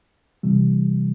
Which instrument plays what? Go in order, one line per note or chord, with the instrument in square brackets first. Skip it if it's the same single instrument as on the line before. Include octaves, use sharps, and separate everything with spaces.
[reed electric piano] C3 E3 G3